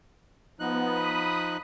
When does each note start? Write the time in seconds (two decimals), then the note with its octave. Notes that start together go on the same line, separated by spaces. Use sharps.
0.60 F3 B3 D#4 F#6
0.92 B5 D#6